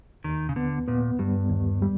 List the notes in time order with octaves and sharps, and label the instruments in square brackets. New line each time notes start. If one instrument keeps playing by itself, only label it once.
[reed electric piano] D#2 [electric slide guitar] D#3
[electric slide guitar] C#3
[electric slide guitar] D3 [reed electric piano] B3
[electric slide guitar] A#2 [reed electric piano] B3
[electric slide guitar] G2 [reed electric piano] G3
[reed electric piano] D#2
G3